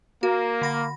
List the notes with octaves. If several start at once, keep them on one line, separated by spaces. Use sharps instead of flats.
A#3 F#4
D3 B5 A#6